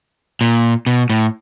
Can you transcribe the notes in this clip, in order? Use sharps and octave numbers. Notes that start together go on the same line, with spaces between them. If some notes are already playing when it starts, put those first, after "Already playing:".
A#2
B2
A2